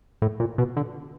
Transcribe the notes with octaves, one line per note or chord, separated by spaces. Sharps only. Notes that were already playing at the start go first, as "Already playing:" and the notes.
A2
A#2
B2
D3